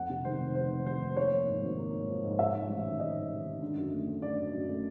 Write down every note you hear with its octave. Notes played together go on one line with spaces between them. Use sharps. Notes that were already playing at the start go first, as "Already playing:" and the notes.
Already playing: F2 F#5
C3
D#3 C5
F1
F1 C5
D#3
D#3 C5
F1
A#3 C#5
F3
G#2
G#1
A#3
G#2
F3
G#2
G#2 E5
G#2
A1
D#3
G#2 D#5
G#2
D#3
D#3
D3
F#2
A3
A3
D3 D5
F#2
F#2
A3